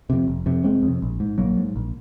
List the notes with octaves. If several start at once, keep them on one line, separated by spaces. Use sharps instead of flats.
F2 C3
F1
F2 C3
F1 G#3 C4
F2
C3
A#1
G#2
A#1 F#3 A#3
G#2
A#1